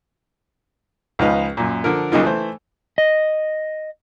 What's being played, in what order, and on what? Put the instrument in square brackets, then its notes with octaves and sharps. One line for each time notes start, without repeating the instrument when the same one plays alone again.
[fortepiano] C#2 F3 G#3 D#4 B4 F5
F#2 A#2
D3 F3 A#4
B1 C#3 A#3 D#4 F4
E3 A3 C5
[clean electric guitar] D#5